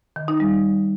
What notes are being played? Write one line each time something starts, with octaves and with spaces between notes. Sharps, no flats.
D#3
D#4
G3